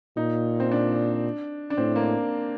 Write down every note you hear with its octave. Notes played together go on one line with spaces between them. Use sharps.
A#2 D#4
C4
D4
D4
A2 C4
A#3